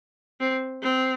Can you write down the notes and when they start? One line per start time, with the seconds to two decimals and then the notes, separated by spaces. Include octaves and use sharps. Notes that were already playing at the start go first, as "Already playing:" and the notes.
0.40 C4
0.83 C4